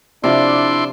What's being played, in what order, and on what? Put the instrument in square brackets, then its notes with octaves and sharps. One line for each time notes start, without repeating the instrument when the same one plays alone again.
[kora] C3 F3 F5 [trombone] D4 [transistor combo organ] E4 D5 C6